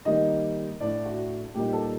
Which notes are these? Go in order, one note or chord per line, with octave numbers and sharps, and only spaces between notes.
D#3 G3 A#3 D#4 D#5
A2 A3 D4 D5
F#4
A#2 G3 A#3 D#4 G4
A4